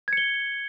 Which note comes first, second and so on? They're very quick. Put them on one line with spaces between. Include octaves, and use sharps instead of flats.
G#6 C#7 G7